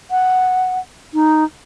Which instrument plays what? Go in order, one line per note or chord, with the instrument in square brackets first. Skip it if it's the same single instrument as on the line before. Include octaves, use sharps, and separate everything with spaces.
[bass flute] F#5
D#4